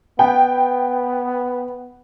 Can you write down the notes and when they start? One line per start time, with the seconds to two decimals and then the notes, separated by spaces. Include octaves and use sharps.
0.19 B3 G5